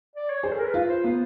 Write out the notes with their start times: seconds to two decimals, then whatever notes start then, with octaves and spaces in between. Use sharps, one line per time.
0.16 D5
0.29 C#5
0.43 G#4 C5
0.52 A4
0.59 A#4
0.65 B4
0.74 F4
0.88 C5
1.04 B3